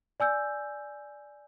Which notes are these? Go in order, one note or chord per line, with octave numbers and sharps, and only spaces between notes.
D5 G#5 E6 G6